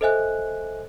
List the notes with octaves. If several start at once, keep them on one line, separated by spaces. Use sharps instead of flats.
A4 C5 D#5 E5 G#5 F#6